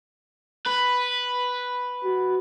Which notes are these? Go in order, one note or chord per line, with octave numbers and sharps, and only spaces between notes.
B4
F#4